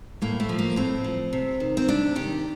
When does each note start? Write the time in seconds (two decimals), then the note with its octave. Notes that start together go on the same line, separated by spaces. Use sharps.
0.22 A2 A#3
0.40 A3
0.49 F3
0.59 A#3
0.76 A2 C4
1.04 F3
1.33 C3
1.60 D#3
1.77 C4
1.88 C3 D4
2.16 D#3 G4